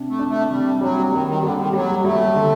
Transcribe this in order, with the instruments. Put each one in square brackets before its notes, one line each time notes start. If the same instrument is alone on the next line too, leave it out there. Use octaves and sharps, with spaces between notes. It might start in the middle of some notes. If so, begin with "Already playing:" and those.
Already playing: [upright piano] C3 D4
[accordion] A3
[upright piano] D4
[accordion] A3
[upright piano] C3 [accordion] G3
[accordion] F#3 [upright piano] G3
[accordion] D#3 [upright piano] G3
[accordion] D#3
[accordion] D3 [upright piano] G3
[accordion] D#3
[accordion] F#3 [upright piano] G3
[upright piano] G3 [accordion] A3
[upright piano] D3